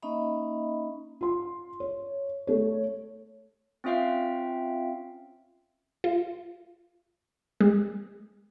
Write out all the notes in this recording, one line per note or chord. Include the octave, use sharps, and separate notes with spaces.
A#3 C#4 D#4 D#5 E5 B5
F4 C6
C#5
A3 C#5
C4 C#4 F4 E5 F5 G5
F4
G#3